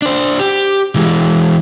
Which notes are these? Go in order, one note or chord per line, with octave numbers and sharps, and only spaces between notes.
D4 C5
G4
E3 G#3